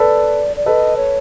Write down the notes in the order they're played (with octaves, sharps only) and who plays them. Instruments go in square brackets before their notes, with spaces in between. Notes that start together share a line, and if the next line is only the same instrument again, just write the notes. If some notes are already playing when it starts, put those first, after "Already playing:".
Already playing: [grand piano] A4 B4 [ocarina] D5
[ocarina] D5
[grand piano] A4 B4 [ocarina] D#5
[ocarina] C#5